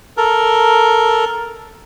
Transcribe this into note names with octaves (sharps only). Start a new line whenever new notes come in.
A4 A#4